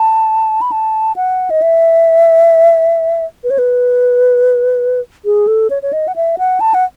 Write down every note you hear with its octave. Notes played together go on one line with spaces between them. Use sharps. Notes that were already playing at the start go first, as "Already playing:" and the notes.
Already playing: A5
B5
A5
F#5
D#5
E5
B4
C#5
B4
G#4
A4
C#5
C#5
D#5
F#5
E5
F#5
A5
F#5